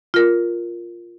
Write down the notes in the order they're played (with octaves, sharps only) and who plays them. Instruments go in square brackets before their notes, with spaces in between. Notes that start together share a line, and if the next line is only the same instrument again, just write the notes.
[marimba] F4 A#4